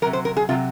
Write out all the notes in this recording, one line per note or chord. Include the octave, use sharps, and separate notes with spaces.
C3 F#3 A#4
C5
A#4
G#4
C3 F#3 F4